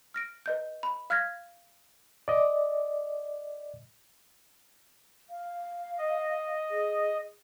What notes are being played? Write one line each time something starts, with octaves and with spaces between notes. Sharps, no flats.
F6 A#6 D7
B4 D#5 G6
B5
F5 F6 F#6 G#6 A#6 B6
D5 D#5
F5
D#5
G#4